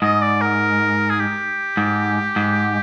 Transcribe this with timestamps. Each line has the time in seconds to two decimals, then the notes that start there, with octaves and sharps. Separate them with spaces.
0.02 G#2 D#5
0.22 D5
0.41 A#4
1.10 G#4
1.19 G4
1.77 G#2
2.36 G#2